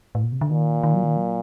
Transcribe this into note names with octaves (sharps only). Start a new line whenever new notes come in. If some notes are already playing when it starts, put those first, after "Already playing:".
A2
A#2
C3
D3
A#2 D#3
D#3
F#3
D#3
F#3